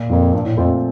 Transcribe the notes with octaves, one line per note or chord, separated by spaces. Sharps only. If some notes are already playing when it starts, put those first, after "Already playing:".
Already playing: A#2
F2 F3 A#3
G2 A#2
A2
F2 A3 C4 F4